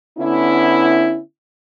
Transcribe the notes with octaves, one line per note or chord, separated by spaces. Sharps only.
D3 B3 C#4 E4